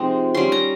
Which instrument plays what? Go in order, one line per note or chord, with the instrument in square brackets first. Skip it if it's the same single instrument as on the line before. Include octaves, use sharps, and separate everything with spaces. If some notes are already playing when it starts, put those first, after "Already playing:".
Already playing: [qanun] C3 F3 G#3 C4 D#4
G3 C#4 C6
A#5